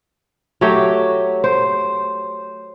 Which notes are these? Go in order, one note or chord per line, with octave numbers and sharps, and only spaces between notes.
F#3 A3 G4 C#5
C5